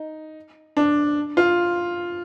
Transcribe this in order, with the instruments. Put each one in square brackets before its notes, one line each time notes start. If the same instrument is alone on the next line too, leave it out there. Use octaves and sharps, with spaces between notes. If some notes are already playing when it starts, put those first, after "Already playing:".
Already playing: [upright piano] D#4
D4
F4